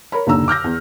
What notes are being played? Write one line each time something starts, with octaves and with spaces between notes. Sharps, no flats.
A#4 C#5 B5
F#1 D#2 A#2 D3 A#5 E6
D6 F6 G6 A#6
E2